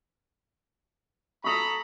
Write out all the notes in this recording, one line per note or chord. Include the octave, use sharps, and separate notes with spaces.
A4 A#5 B5 C#6 D#6